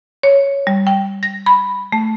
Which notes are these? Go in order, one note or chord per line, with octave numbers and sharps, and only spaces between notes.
C#5
G3
G5
A#6
B5
A3